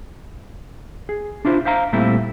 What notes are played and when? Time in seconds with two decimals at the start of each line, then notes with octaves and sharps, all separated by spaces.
1.09 G#4
1.45 D4 E4 F4 C5
1.65 C5 E5 F5 A#5
1.93 A#2 G3 A3 C4 E4